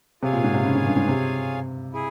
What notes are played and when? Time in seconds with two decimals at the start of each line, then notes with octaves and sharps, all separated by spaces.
0.22 C3 F4 G#4 C#5 F5 G#5
0.33 A#2
0.44 G#2
0.54 C3
0.65 C#3
0.75 G#2
0.86 G2
0.97 G#2
1.08 C3
1.93 E4 G#4